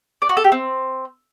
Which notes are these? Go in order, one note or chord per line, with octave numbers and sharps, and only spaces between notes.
D5
F#4
A4
G4
C4